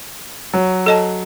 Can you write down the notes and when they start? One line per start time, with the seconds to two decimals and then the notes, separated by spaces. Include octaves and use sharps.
0.54 F#3
0.86 A4 D#5 A5